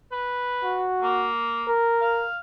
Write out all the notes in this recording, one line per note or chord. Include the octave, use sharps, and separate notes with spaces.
B4
F#4
A#3
A#4
F5